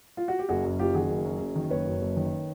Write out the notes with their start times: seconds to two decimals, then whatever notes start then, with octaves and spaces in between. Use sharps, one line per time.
0.17 F4
0.28 F#4
0.39 G4
0.49 F#1 F#4 G#4
0.64 F#2
0.79 F#1 F4 G4
0.95 D#3 F#4 G#4
1.10 F#1
1.25 F#2
1.41 F#1
1.56 D#3
1.71 F#1 B4 C#5
1.86 F#2
2.01 F#1
2.16 D#3